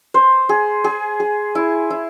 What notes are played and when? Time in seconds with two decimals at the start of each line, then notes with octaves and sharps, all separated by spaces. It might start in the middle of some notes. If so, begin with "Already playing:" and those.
0.14 C5
0.49 G#4
0.84 G#4
1.20 G#4
1.55 E4
1.90 E4